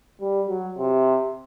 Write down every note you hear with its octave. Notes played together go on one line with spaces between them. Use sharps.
G3
F#3
C3